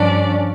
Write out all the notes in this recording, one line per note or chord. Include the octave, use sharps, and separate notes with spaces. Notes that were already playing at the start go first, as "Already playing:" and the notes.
Already playing: G2 F3 C#4 D4 D5